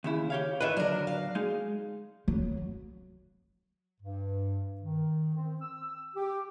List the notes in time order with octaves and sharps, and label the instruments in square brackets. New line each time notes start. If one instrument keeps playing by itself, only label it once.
[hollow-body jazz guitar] D#2 C#3 E4
G4 C#5 F5
[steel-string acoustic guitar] D#3 E3 [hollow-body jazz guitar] B4 E5
[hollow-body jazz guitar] D3 F#3 [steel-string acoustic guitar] D4 A#4
[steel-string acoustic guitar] F5
[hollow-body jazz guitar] G#3 D#4
[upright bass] F#3
[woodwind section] G2
D#3
C4
E6
G4